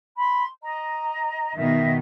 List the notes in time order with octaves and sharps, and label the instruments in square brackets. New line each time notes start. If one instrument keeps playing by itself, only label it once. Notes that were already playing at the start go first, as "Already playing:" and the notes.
[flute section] B5 C6
D#5 A#5
[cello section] B2 D#3 [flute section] D#5 E5